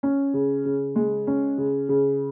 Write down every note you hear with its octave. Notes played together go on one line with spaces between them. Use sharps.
C#4
C#3
C#3
G#3
C#4
C#3
C#3